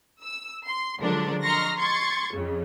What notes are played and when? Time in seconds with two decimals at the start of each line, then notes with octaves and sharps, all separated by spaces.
0.22 E6
0.66 C6
1.00 D3 F3 F#3 G#3 D4 A#4
1.43 D#5 A#5 C6 C#6 F6 A#6
1.77 C6 C#6 G#6 A6
2.34 F2 C#3